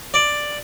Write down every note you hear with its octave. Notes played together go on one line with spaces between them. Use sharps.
D5